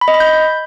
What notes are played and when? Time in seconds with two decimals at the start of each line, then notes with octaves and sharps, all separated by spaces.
0.01 B5
0.08 D#5
0.14 B5
0.20 G6